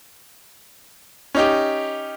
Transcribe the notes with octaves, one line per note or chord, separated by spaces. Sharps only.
C#4 D#4 G4